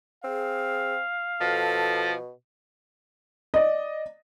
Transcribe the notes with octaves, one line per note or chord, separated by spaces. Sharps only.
C4 G#4 F5
B2 F3 A4
D5 D#5